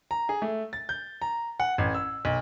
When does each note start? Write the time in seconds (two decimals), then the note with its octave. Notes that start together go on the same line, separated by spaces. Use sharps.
0.11 A#5
0.29 G#4
0.42 A3
0.73 A6
0.89 G6
1.22 A#5
1.60 F#5
1.78 A1
1.95 E6
2.25 B1